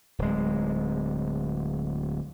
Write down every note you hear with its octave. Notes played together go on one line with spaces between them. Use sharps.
D1 G#3